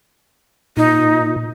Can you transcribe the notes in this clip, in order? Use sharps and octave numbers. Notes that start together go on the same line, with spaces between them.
A#2 D#4